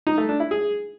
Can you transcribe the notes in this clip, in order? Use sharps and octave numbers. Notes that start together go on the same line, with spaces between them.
D#4
A3
D4
E4
G#4